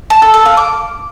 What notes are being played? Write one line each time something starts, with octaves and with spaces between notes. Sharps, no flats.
A5
A4
A4
F5
D6